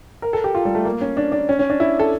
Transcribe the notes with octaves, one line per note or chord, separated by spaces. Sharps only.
A#4
A4
G4
F4
G3
A3
A#3
C#4
D4
D4
C#4
C#4
D4
E4
A4